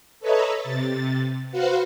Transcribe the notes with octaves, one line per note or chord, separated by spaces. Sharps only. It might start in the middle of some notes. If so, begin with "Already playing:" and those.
A4 B4 C#5 D#5 E5 A#5
C3 A6
F#4 B4 C5 F5 F#5